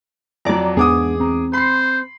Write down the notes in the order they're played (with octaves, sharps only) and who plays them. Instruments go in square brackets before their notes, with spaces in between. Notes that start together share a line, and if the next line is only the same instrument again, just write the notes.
[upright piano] F2 F#3 [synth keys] D5 A#5
[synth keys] E2 G#2 [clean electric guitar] B3 D4 F#5 [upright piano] G#4 D6 D#6
[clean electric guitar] C4 A#5
[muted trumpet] C5 [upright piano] B5 C7 [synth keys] C6